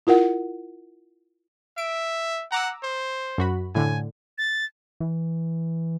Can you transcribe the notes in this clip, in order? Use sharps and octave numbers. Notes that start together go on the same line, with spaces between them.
E4 F4 A#4 F#5
E5 D7
F#5 A#5 D6 E6
C5
F#2 F#4 B5
A2 D3 G#5
A6
E3